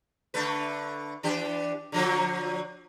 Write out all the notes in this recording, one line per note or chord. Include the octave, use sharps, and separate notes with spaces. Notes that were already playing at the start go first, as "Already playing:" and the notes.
D3 A3 B4
E3 D4 G4
D3 F3 F#3